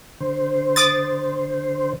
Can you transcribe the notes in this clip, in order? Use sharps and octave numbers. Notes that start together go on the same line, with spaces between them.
D3 C5
D6 D#6 A6